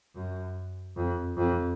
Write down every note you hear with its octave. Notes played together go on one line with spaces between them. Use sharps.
F#2
F2
F2